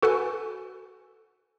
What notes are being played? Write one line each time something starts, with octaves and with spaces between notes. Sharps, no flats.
F#4 A4 B4 F#5 G#5